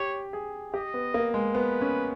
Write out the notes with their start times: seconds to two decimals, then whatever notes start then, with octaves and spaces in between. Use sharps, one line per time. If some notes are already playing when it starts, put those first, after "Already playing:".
Already playing: G4 C#5
0.33 G#4
0.74 G4 D#5
0.94 B3
1.14 A#3
1.34 G#3
1.54 B3 B4
1.81 C#4